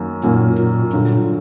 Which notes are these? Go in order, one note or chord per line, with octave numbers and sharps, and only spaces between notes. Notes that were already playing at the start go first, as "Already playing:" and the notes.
Already playing: F#2 D#3 F#3 A#3
F#2 A#2 D#3 F#3 A#3
A#2
G2 A#2 D3 F#3